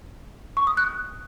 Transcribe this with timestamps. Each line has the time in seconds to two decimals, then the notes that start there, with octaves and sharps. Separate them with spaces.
0.57 C#6
0.67 D#6
0.77 F#6